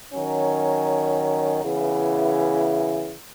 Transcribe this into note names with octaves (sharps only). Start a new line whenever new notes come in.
D#3 F#3 C#4
C#3 E3 B3 E4